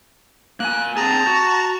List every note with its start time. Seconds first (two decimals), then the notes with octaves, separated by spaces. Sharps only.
0.60 A#3 G#5 F#6
0.97 C4 G#4 A5 A#5
1.27 F#4